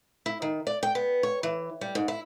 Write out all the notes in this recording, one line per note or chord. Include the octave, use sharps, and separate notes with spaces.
E4
D#3
D5
G5
B3
C#5
E3
G3
G#2
E4